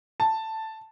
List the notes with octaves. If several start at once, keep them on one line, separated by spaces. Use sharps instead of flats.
A5